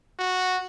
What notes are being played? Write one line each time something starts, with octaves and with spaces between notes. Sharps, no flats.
F#4